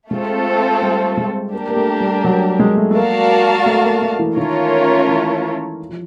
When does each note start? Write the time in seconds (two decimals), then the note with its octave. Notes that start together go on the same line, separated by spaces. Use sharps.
0.11 G#3 A3 C4 F4 A4
0.82 G3
1.17 G#3
1.53 A#3 D4 G4 A#4
1.69 A#3
1.76 A3
2.00 G3
2.24 F#3
2.60 G#3
2.77 A3
2.91 A3
2.95 A#3 F#4 A#4 D5 F5 A5
3.66 A3
3.84 A#3
4.02 A3
4.19 E3
4.37 D#3 A3 C#4 F4 A#4 C#5
5.08 E3
5.89 F3